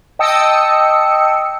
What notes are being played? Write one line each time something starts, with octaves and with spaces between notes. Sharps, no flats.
D#5 G5 A5 D#6 E6 C#7